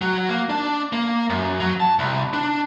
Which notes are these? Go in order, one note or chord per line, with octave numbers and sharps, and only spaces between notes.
F#3
A#3
D4
A#3
F#2
F#3
A5
C2
D4